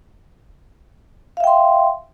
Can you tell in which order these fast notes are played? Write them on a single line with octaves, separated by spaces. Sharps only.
F5 E5 G5 C6